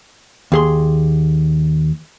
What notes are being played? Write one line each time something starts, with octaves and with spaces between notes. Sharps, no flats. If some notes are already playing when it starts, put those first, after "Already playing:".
D#2 G#4 C6